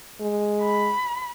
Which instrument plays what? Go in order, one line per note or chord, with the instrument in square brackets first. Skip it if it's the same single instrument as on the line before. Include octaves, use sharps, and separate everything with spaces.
[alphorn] G#3
[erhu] B5